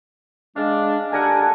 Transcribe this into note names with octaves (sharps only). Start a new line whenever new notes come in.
G#3 D4 F5
D4 G4 A4 A#4 F#5 G#5
A4